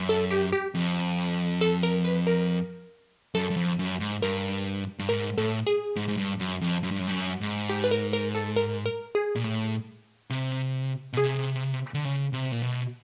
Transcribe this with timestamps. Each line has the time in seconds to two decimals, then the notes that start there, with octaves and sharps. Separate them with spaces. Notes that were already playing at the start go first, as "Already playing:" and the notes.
Already playing: F#2
0.09 A4
0.31 G4
0.53 G4
0.75 F2
1.61 A4
1.83 A#4
2.05 B4
2.27 A#4
3.35 F#2 A4
3.50 F#2
3.57 F2
3.79 F#2
4.00 G#2
4.22 G2 A#4
4.99 G2
5.09 G#2 A#4
5.38 A2 A4
5.67 G#4
5.96 G#2
6.08 G#2
6.17 G2
6.39 F#2
6.61 F2
6.83 F#2
6.91 G2
6.99 F#2
7.07 G2
7.11 F#2
7.41 G#2
7.70 G4
7.84 B4
7.91 A#4
8.13 A#4
8.35 A4
8.56 A#4
8.86 A#4
9.15 G#4
9.35 A#2
9.44 A2
10.30 C3
11.13 B2
11.17 C3 G#4
11.94 D3
12.05 C#3
12.33 C3
12.52 A#2
12.62 B2